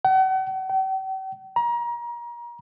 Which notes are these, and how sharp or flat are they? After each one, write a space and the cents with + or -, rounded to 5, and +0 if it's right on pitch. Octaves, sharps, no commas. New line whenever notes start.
F#5 +40
G5 -45
A#5 +30